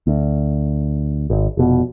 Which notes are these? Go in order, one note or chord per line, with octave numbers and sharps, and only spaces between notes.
D2
G#1
F1 B2